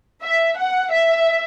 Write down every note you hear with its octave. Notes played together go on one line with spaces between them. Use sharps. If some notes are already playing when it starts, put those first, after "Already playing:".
E5
F#5
E5